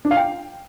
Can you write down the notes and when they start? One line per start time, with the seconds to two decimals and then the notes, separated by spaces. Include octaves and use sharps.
0.05 D4
0.11 F5
0.17 G5